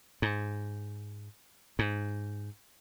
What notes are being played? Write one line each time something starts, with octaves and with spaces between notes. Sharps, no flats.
G#2
G#2